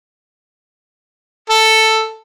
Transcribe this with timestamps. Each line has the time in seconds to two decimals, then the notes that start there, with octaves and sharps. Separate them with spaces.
1.50 A4